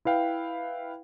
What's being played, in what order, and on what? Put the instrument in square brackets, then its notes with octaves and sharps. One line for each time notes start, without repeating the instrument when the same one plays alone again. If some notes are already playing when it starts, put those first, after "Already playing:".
[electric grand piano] E4 B4 F5 G5